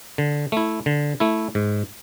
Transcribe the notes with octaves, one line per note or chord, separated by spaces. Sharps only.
D3
A3 E4
D3
A3 E4
G#2